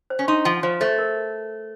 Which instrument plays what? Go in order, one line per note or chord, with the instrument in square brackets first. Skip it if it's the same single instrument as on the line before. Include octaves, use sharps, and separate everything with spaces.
[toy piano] C5
[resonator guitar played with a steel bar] C#4
[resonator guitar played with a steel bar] D#4 [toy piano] C6
[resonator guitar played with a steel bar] F3 [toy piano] F#5
[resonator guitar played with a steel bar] F3 [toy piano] C5
[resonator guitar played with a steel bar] A3 [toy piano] C5
[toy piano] A#4